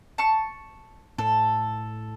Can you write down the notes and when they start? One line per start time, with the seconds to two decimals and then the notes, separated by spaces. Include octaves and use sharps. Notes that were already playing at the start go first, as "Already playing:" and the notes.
0.18 A5 C#6
1.18 A2 A4